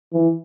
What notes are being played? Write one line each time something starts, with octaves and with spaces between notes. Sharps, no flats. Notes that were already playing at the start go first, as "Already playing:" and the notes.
E3